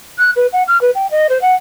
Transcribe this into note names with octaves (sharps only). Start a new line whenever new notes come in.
F#6
B4
F#5
F6
B4
G5
D#5
C5
F#5